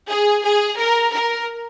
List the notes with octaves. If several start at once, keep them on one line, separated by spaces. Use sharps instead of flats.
G#4
G#4
A#4
A#4